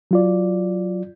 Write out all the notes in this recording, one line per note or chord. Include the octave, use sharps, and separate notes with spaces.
F#3 F4 D5